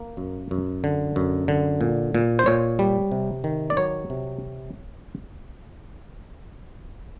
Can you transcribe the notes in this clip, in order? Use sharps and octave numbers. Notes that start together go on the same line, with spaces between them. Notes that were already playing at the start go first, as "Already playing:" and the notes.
Already playing: A#3
F#2
F#2
D3
F#2
D3
A#2
A#2
C5
A#2 C#5
G3
C3
D#3
D5
F#3 C#5
C3